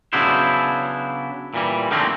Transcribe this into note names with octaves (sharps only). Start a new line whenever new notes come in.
C#3 F#3 B3 D4 E4 C5
A#2 E3 G3
D3 D#3 F3 A3 A#3 C4